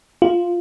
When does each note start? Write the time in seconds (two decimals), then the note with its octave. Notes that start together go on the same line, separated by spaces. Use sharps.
0.22 F4